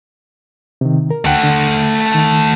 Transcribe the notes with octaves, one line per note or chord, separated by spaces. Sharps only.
C3 D#3
A#4
D2 A3 F#5 G5
D3
D#3